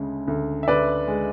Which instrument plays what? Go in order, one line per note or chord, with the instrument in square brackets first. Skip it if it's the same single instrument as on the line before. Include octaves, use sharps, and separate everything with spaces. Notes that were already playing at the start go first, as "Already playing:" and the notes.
Already playing: [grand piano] D2 C#3 G#3
D2
E5
D2 B4 D5
G#3